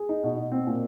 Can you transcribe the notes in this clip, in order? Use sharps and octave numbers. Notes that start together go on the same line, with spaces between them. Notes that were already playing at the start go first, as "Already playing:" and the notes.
Already playing: G#4
D#4
B2
B2
C4
A#2